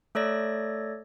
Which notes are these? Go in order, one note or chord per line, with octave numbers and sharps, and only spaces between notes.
A3 A4 C#5 D5 A#6